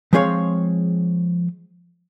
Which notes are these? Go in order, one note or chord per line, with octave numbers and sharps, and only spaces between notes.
F3 G#3 C4 G#4 C#5 F5